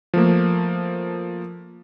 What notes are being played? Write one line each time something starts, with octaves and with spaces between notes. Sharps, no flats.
F3 A3 A#3